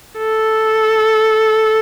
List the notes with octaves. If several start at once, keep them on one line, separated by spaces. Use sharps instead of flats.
A4